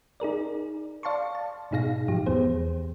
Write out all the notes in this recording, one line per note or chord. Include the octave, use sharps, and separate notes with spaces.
D#4 G#4 A#4 D5
D5 F5 A5 C6 C#6
A5
G#2 B2 D#4 G#4 F5 A#6
G#2 F3 G4
E2 E3 B3 G#4 C5